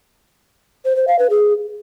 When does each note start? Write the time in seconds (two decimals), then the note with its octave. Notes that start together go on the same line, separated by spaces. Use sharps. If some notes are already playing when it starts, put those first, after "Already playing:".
0.85 C5
0.96 C5
1.08 F5
1.19 B4
1.30 G#4